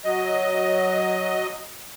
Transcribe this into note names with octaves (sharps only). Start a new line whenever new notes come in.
F#3 D#5